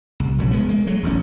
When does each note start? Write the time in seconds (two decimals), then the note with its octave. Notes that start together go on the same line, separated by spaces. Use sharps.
0.20 C2
0.38 A#1 C#3 F#3
0.51 E1 G#3 B3
0.69 G#3 A#3
0.87 F#3 G#3 A3
1.03 E1 A1 F#2 C#4